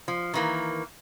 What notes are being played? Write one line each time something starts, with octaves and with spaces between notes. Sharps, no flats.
F3
D#3 E3 A#3